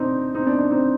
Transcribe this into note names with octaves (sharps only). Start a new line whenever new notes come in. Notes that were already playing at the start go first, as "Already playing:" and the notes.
Already playing: C4 D4 D#4
C4 D#4
D4
D4
C4 D#4